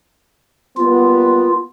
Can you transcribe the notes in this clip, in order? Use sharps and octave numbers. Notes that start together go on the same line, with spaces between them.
G3 A#3 B3 F4